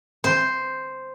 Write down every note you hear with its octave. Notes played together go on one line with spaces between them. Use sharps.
C5